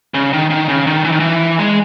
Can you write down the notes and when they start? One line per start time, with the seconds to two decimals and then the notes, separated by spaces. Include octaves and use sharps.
0.14 C#3
0.33 D#3
0.50 D#3
0.69 C#3
0.87 D#3
1.04 E3
1.12 D#3
1.20 E3
1.59 G#3